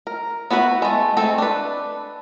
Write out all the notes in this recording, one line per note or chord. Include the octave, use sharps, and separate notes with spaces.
A#4
B3 E4 F#4 B4
G#3 A3
G#3 A3 C4 A4
D4 B4